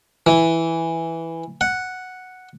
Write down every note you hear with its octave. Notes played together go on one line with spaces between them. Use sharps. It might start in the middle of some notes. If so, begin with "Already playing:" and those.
E3
F#5